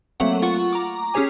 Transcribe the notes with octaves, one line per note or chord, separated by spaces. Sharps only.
F#3 A3 A#3 C4 F#5
F4 F#5 C#6
A#5 D6
C#4 G4 G#4 C#5 G#5